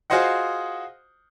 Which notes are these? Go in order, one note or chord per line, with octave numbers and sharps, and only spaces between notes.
F4 F#4 G#4 C5 D#5 F#5